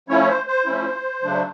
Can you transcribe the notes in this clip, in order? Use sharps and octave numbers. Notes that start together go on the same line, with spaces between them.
F3 A3 C#4 E4 C#5
C#5
C5
C5
F3 A3 C#4 E4
C#3 F#3 A3 D4